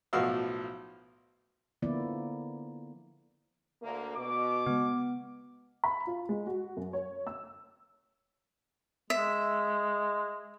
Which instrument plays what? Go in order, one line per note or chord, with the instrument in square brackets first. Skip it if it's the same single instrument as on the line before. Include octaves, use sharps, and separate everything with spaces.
[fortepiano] B1 A2 F3 F#4 F5 E6
[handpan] D3 F3 A#3 B3 E4 D5
[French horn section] D2 A#3
[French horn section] B2 [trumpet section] D6
[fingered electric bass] C#3 G#3 [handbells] B3
[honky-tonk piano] B5
F4
G#3
F#4
F#2
C#5
E6
[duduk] G#3 [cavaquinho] E5